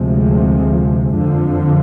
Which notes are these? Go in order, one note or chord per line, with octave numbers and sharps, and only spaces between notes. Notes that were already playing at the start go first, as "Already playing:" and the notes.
Already playing: D2 C3 F3 G#3
F2 D3 F3